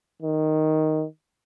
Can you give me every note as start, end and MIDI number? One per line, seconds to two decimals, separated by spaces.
0.22 1.05 51